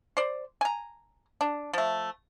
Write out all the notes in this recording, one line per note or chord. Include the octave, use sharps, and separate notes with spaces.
C5 D5
G#5 A#5
D4
F3 A3